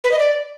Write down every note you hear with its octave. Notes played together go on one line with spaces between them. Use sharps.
B4
D#5
D5